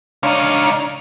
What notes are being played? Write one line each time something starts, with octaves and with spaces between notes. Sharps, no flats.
C#2 D4 D#4 C#5 F5